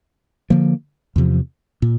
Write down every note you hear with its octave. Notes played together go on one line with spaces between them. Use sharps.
D3 F3 A#3
E2 C3 F3
A#2